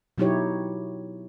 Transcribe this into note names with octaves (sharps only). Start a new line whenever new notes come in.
B2 F#3 D#4 E4 G4 C#5